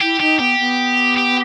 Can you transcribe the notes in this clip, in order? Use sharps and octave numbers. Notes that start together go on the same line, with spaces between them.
E4 G4
D#4 G4
B3 G4
B3
G4